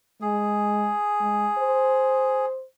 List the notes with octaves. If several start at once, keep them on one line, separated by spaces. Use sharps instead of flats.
G#3 G#4
G#3
C5